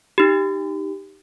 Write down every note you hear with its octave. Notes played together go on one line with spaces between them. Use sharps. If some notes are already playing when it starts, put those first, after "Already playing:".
D#4 G4